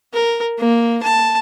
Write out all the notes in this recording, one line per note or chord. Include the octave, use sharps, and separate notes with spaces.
A#4
A#3
A5